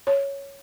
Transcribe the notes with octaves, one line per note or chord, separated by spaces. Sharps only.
C#5